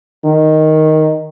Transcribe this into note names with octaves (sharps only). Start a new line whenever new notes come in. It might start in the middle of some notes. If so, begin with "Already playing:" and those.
D#3